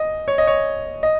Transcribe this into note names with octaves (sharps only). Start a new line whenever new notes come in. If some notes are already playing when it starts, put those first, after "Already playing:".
Already playing: D#5
C#5
D#5
C#5
D#5